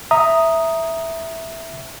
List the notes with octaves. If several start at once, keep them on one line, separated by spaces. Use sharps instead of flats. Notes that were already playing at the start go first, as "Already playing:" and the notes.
E5 A#5 D#6